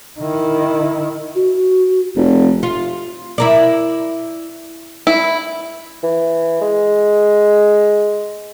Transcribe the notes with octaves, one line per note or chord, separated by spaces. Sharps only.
D#3 E4
F#4
F1
F4
E4 A#4 D5
E4
E3
G#3